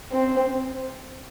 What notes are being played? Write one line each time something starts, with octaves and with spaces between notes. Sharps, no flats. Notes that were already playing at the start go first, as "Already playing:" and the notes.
C4